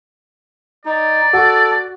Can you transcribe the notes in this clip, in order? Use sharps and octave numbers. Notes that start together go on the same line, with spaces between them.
D#4 D5
F#4 A4